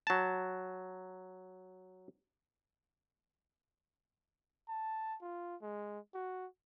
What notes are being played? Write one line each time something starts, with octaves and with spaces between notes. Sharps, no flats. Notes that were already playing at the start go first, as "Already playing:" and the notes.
F#3 A5
A5
F4
G#3
F#4